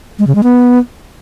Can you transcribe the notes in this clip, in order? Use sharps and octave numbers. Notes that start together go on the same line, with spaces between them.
G#3
C#3
G#3
B3